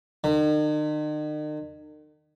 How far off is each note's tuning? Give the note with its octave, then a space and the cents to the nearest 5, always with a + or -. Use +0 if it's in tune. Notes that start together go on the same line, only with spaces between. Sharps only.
D#3 -45